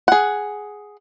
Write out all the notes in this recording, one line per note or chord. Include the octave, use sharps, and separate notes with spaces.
G#4 F#5